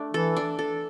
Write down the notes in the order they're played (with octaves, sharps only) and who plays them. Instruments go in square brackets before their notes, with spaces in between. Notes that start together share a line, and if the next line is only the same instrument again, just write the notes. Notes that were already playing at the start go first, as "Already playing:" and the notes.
Already playing: [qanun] A3 D4
[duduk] E3 [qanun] A4
[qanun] D4
A4